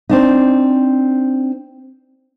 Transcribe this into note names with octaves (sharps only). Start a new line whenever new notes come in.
C4 D4 D#4